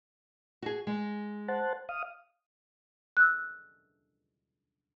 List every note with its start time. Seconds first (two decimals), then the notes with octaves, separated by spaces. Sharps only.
0.62 F#4 G#4
0.87 G#3
1.48 C5 F#5 A5
1.89 F5 D#6
3.17 E6 F#6